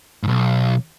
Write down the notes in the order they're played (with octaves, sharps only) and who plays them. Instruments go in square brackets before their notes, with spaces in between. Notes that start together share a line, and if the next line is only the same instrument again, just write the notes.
[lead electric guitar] B1 G#2